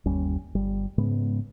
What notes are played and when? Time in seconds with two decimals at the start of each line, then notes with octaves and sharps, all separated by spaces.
0.06 G1 D#2 G3 C#4
0.55 G1 G3
0.98 G#2 C#3 G#3 B3